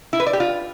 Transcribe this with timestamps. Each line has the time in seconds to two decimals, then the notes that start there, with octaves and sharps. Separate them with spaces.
0.13 E4
0.20 B4
0.26 D5
0.33 G4
0.40 F4